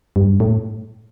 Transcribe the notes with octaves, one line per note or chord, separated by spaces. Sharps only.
G2
A2